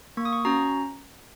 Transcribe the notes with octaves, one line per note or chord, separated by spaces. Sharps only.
A#3 C#6
D#6
C#6
C#4 F#4 A#5